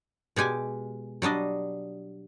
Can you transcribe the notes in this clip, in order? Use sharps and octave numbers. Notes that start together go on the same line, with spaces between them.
B2 G#3 G4 G#5
F#3 G3 D4 D#5